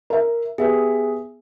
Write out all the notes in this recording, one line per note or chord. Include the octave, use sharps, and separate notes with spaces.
A#4 E5
B3 G4 G#4 E5